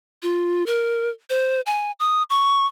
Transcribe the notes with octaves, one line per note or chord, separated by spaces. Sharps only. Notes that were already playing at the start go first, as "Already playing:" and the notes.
F4
A#4
C5
G#5
D#6
C#6